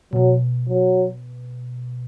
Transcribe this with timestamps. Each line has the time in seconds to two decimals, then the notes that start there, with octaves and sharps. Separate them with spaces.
0.13 B2 F#3
0.68 F#3